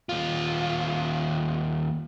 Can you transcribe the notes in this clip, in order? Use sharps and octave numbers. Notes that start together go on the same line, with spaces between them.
D#2 F4